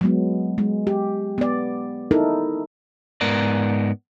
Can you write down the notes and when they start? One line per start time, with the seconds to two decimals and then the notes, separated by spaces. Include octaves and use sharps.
0.01 F#3 G#3 B3
0.58 G#3
0.87 G4
1.38 B3 D5
2.11 D#4 E4 A4 A#4
3.21 G#2 B3 A#4 D5